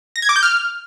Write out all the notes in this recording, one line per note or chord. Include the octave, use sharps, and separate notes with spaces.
A#6
G#6
D6
G6
F6